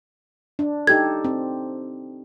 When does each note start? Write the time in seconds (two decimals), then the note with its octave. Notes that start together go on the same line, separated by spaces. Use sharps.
0.59 D4
0.87 D#4 G4 A4 G#6
1.25 C4